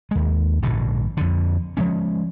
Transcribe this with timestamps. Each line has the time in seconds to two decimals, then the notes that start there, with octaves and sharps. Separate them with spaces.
0.11 D#2 G#3
0.62 A#1 G#2 B2 D3
1.17 F2 D3
1.77 F3 G#3 C#4